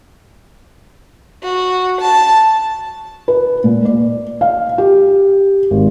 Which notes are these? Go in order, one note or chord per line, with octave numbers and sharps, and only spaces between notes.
F#4
A5
B4
A#2
D5
F5
G4
G#1